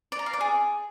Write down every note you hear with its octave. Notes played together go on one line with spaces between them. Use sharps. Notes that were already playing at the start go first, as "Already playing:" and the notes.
D5
A#5
F5
D5
G#4